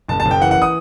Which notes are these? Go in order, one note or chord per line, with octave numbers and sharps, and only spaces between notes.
F#1 A5
A5
F#1
G5
E3 F#5
F#5
D#6